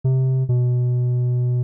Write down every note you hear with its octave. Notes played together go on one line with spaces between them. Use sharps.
C3
B2